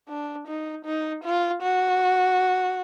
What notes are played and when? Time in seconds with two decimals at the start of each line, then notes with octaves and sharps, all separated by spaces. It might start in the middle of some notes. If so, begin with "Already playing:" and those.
0.09 D4
0.48 D#4
0.85 D#4
1.24 F4
1.62 F#4